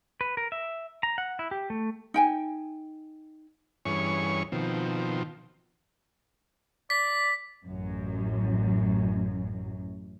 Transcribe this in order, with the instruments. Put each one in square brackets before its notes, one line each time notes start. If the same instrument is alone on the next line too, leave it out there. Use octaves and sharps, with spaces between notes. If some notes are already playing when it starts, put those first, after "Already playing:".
[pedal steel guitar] B4
A#4
E5
A#5
F#5
E4
G4
A3
[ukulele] D#4 G5 G#5
[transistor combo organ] G2 E3 C#4 G#4 C#5 C#6
B2 D#3 F3 C4
[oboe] D5 [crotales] B6
[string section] A1 F#2